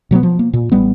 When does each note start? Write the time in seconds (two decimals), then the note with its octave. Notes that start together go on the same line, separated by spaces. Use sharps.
0.11 B2 F#3 A#3 B3
0.23 F3
0.39 A#3
0.53 A#2
0.72 A1 G3 B3